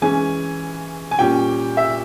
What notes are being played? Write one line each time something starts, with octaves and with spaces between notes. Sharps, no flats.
E3 G#3 C#4 G#5
G#5
A#2 G3 C#4 G5
E5